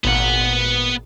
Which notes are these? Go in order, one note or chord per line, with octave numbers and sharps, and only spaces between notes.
G#1 A#2 B3 F#5